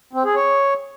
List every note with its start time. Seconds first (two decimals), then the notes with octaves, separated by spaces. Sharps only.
0.13 C4
0.24 G#4
0.35 C#5